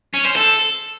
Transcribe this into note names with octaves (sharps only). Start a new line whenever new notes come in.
C#4
C5
A4